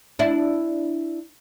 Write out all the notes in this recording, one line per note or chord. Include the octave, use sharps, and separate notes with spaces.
D4 E4